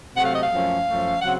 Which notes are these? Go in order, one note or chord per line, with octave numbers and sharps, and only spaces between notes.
C3 F#3 A3 F#5
F5
D#5
F5
F#2 F3 A3 C#4
F#2 F3 A3 C#4
C#3 F#3 C4 F#5